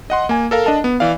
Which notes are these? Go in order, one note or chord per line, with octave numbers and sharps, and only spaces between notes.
D#5 F#5 C6
A#3 G#5
A4 A#4 F5
D4 D#5 A5
B3
E3 D5 F5